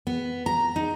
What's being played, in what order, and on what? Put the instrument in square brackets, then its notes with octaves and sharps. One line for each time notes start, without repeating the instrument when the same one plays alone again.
[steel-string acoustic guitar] B3
A#5
D#4